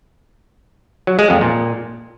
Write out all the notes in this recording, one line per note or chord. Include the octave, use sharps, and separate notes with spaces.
F#3
G#3
F2
A#2